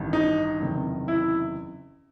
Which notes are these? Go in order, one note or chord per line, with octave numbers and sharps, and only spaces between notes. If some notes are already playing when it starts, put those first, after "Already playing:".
Already playing: A1 G2 D#3
D#4
F#1 E2 C3 D#3
E4